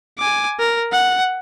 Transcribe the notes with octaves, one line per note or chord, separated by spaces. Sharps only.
G#5 D6
A#4
F#5